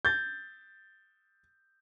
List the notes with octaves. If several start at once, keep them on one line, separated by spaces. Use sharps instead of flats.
G6 A6